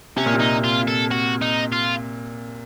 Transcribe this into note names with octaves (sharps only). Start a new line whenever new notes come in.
C3 C#4
A#2
C3
D#4
F4
A4
F#4
D#4
F4